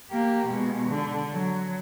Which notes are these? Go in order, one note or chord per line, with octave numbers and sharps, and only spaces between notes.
A#3 G4
B2 G#3
D3
F#3